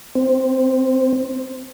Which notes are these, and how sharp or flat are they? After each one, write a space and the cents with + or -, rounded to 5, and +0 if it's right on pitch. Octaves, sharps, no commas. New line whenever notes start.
C4 -10 C5 +0